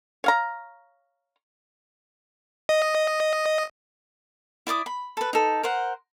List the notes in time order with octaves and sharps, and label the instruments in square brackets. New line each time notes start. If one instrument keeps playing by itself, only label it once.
[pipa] C#5 F5 A#5
[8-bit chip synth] D#5
[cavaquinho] E4 D5 D6 D#6
B5
A4 B4
D#4 A4
A#4 C5 F#5